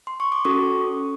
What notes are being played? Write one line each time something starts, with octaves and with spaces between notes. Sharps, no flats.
C6
C#6
D6
C#4 F#4 A4 C#6 D#6